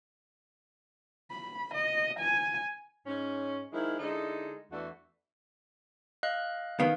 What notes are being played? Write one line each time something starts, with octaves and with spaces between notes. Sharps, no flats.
B5
D#5
G#5
G#2 C#4
D#3 F3 G#3 E4
D3 G#3 D#4 E4 A4
E2 E3 A3 D4 F#4
D#5 F5 F#6
D#3 B3 F5